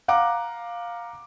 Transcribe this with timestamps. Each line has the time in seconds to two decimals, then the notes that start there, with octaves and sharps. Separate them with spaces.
0.08 F5 F#5 A#5 D6